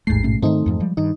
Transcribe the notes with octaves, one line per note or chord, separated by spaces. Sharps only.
A1 D#2 G#2 A3 C7
B2 A3 C#4
G#2 D#3 A3 C4 D#4
F2 G#2 F3
F3 G3 G#3
G2 D#3 D#4